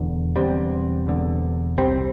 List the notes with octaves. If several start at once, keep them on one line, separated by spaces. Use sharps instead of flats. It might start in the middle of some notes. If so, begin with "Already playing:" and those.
Already playing: E1 E2 D3
E1 E2 D3 G3 C4
E1 E2 D3
C2 C3 G3 C4